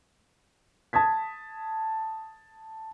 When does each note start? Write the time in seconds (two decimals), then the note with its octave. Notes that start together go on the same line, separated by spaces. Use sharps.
0.93 A5 D#6 G#6 B6